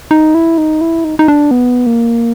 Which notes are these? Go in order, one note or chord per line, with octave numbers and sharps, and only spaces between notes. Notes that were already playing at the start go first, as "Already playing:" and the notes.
D#4
E4
D#4
E4
D#4
D#4
D4
B3
A#3